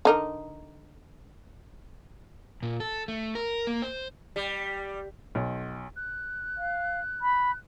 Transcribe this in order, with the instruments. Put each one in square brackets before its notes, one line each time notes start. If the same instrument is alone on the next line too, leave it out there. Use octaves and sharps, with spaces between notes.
[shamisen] D3 D#4 A#4
[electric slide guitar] A#2
A4
A3
A#4
A#3
C5
[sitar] G3
[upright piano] B1
[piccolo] F#6
[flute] F5
B5